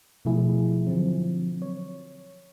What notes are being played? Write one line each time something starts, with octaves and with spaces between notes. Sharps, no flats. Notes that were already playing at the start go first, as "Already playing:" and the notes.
B2 F3 A3 E4 G#4
D3 F3 F#3 C4
C#5